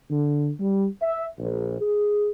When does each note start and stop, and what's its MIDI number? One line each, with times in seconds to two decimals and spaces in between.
0.10 0.50 50
0.59 0.86 55
1.01 1.24 76
1.38 1.80 34
1.81 2.30 68